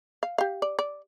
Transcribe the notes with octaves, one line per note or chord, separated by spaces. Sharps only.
F5
G4 F5
D5
D5